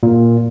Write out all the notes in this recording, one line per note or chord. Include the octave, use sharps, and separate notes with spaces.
A#2